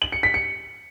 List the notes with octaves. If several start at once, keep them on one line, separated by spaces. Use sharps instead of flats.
F#7
C#7
B6
C#7